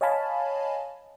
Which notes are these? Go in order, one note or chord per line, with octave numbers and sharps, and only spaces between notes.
C#5 D#5 F5 G#5 A5 B5